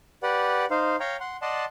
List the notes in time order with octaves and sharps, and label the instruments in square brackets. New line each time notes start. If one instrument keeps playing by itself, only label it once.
[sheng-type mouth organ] G4 B4 D5 F#5
D#4 C5 F5
C#5 F5 G5 A#5
F#5 C6
D5 D#5 F#5 A5 C6